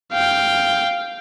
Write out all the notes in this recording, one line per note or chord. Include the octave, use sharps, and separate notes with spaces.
F5 G5